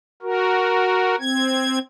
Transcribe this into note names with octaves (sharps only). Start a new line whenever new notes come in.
F#4 A#4
C4 G#6